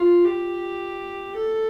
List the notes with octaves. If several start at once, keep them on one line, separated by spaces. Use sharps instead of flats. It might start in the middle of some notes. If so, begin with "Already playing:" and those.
Already playing: F4
G4
A4